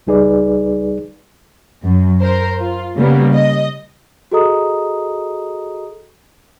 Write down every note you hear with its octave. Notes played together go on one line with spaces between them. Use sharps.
C#2 G3 D#4 G#4 B4 D5
F#2
A#4 C5
F4
C#3 G3 A#3 B3
D#5
F#4 G#4 A4 D#5 A#5 D#6